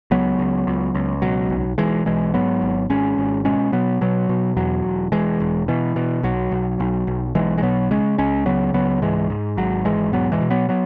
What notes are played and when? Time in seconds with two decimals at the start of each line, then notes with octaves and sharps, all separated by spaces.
0.11 C#2 F#3 B3
0.39 C#2
0.67 C#2
0.95 C#2
1.22 B2 F#3
1.50 B1
1.78 B1 E3 G#3
2.05 B1 E3 G#3
2.34 G#2 F#3 B3
2.62 G#1
2.90 G#1 G#3 C#4
3.18 G#1
3.45 B2 G#3 C#4
3.72 B2 F#3 B3
4.01 B2 F#3
4.29 B2
4.57 E2 F#3
4.84 E1
5.12 E1 E3 G#3
5.40 E1
5.68 B2 E3
5.96 B2
6.23 B1 F#3
6.52 B1
6.80 B1
7.07 B1
7.35 B1 E3 G#3
7.58 G#3
7.62 B2 F#3 B3
7.91 C#3 G#3 C#4
8.18 C#2 G#3 C#4
8.46 C#3 F#3 B3
8.73 C#2 F#3 B3
9.02 G#2 E3 G#3
9.30 G#2
9.57 G#1 F#3
9.85 G#2 E3 G#3
10.13 E1 F#3 B3
10.32 E3 G#3
10.41 B2
10.50 F#3 B3
10.69 F#3 B3